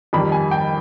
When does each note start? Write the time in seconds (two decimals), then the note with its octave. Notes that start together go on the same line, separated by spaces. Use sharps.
0.13 F2 D#3 G3 B5
0.32 G#5
0.51 G5